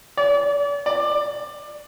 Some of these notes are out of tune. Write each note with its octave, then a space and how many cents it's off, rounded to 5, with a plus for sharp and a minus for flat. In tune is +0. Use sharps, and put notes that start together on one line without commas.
D5 -40
D5 +20